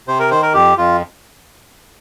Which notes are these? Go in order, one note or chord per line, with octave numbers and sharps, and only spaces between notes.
C3 C5
A#4
D#3 C5
A#4
F2 G4
F2 F4